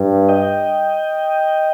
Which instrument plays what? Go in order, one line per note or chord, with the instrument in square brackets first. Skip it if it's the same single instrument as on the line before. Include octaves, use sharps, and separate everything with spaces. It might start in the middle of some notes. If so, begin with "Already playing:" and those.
Already playing: [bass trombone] G2
[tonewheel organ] D#5 G5